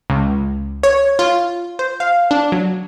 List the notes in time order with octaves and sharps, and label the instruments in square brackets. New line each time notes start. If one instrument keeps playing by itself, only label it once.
[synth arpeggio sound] C#2
C#5
F4
C5
F5
D4
F#3